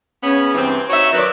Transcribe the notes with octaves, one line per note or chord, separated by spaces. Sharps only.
C#3 B3 C#4
G2 E3 C4
D#4 F#4 C#5 E5
D#3 F#3 B4 D5